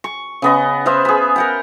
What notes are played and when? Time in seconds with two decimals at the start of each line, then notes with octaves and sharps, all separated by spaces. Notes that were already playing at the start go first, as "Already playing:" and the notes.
0.04 C#6
0.42 C#3 B3 D#5
0.86 B3 C5 E5 F5
1.05 G#4 B5
1.36 A#4 F#5 G5